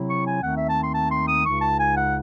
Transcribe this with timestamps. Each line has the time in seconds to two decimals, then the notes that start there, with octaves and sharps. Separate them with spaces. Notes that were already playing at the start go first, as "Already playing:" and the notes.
Already playing: C3 F#3 C4 E4
0.08 C#6
0.25 G#5
0.42 D#2 D#3 A3 C4 D#4 F#5
0.55 E5
0.67 A5
0.80 C6
0.93 A5
1.10 C6
1.27 D#6
1.44 C#2 C#3 G#3 D#4 C#6
1.61 A5
1.78 G#5
1.96 F#5